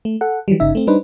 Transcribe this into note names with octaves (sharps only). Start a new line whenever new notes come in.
A3
A4 F#5
E3 F#3 G3
G1 C#3 D#4 E5
A3 C4
G3 D4 D#4 B4 C5